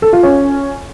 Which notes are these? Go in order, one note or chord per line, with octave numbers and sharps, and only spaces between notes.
A4
F4
C#4